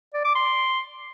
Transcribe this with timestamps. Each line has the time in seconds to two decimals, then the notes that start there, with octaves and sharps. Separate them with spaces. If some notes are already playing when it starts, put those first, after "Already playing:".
0.14 D5
0.25 D6
0.36 C6